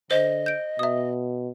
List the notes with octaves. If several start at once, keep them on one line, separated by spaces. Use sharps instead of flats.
D3 C5 D#5
G6 D7
B2 E5 D#6